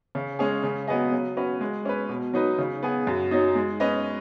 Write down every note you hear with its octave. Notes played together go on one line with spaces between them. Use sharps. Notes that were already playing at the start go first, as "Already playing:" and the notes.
C#3
G#3 C#4 G#4
C#3
F#3 B3 G#4 D#5
F#3
C#4 F#4 B4
G#3
C#4 B4
B2
F#3 D#4 B4
C#3
B3 G#4
F#2
F#3 D#4
G#3
C#4 B4 D#5